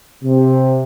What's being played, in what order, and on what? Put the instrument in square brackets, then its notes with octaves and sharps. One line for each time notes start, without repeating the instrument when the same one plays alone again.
[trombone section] C3